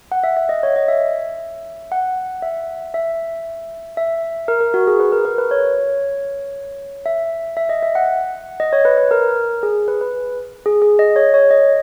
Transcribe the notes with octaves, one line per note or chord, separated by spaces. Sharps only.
F#5
E5
E5
D#5
C#5
D#5
E5
F#5
E5
E5
E5
A#4
A#4
F#4
G#4
B4
A#4
A#4
B4
C#5
E5
E5
D#5
E5
F#5
D#5
C#5
B4
B4
A#4
G#4
B4
B4
G#4
G#4
D#5
C#5
C#5
D#5